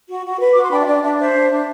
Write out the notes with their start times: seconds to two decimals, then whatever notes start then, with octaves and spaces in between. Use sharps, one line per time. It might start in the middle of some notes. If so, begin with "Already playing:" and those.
0.09 F#4
0.25 F#4
0.40 B4
0.53 F#4 D6
0.63 C6
0.71 D4 G5 B5
0.81 E5
0.87 D4 D5
1.03 D4 E5
1.19 C5 E5
1.34 D4
1.50 D4